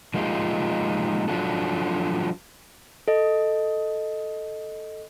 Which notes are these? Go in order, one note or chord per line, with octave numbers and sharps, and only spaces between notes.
F3 G#3 A#3 D#4 F4 G4
F3 F#3 D4 F4 F#4 A4
A4 D#5